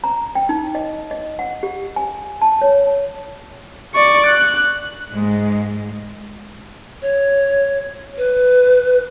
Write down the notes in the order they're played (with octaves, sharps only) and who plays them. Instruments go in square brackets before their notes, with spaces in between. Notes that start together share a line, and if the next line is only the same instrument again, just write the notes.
[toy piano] A#5
G5
D#4
D#5
D#5
F#5
G4
G#5
A5
C#5
[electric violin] D5 C#6
F#6
[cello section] G#2 G#3
[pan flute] C#5
B4